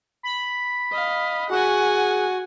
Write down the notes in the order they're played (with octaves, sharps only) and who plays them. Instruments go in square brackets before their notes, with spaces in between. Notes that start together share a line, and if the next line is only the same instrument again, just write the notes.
[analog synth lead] B5
[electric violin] D#5 F5
[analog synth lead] F#4 [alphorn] G#4 [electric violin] F#5 G#5